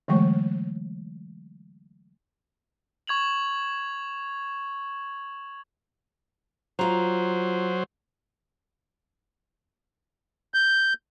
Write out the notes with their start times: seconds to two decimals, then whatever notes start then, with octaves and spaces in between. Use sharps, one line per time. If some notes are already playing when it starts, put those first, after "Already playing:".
0.08 D3 E3 F#3 G#3 A3 C#6
3.07 C#6 G#6 F7 F#7
6.79 F#3 F4 C5 A#5
10.54 G6